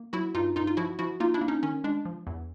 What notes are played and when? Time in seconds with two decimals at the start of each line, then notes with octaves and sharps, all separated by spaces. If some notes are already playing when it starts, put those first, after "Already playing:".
Already playing: A#3
0.13 F#3 E4 F#4
0.35 G2 D#4 F4
0.56 G2 D#4 F4
0.67 F4
0.77 F3 E4 F#4
0.99 F3 E4 F#4
1.20 A#3 D#4 F4
1.34 D4 E4
1.41 A#3
1.48 C#4 D#4
1.63 D#3 C#4
1.84 G#3 D4
2.05 F3
2.27 E2